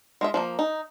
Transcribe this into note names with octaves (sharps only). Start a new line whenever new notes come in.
G#3 F4 E5
F3 A3 A#3
D#4